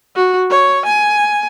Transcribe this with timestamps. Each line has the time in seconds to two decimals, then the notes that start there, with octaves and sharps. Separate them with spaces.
0.16 F#4
0.50 C#5
0.86 G#5